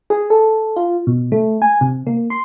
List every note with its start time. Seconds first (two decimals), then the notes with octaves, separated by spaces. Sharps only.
0.10 G#4
0.30 A4
0.76 F4
1.07 B2
1.32 A3
1.62 G#5
1.81 C3
2.07 A#3
2.30 C6